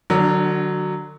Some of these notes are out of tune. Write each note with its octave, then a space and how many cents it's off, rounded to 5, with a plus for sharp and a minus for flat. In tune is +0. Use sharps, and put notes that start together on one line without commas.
D3 +35 F#3 +0 D4 +0